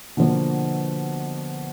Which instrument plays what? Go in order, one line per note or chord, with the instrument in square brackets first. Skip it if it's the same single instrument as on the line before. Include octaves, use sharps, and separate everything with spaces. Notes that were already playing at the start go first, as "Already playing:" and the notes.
[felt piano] B2 D3 F3 A#3